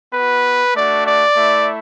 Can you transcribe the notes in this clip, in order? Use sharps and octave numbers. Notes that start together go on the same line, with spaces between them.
B3 F#4 B4
A3 D4 F#4 D5
D5
A3 E4